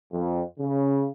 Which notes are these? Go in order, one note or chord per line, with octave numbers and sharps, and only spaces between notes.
F2
C#3